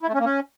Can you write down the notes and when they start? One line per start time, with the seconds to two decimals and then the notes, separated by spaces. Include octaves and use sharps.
0.03 E4
0.08 A3
0.14 C#4
0.19 A#3
0.25 C#4